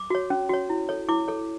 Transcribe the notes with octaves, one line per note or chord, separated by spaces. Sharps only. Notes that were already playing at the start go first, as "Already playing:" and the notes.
Already playing: D6
F#4 C#5
C#4
F#4 C#5
E4
A4 C#5
E4 D6
A4 C#5